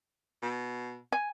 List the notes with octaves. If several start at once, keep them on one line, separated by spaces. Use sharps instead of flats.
B2
G#5